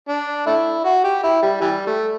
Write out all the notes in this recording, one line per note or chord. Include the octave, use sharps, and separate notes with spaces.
D4
A3 E4
F#4
G4
E4
G3
E3 G3
A3